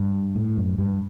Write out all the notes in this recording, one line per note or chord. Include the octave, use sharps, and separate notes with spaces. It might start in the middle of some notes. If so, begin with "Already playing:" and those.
Already playing: G2
A2
F#2
G2